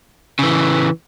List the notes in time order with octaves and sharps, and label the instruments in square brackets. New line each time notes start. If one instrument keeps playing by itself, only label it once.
[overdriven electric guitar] C#3 E3